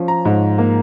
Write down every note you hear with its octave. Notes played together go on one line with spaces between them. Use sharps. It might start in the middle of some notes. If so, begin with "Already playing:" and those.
Already playing: F3 C#4
A#5
G#2
A#3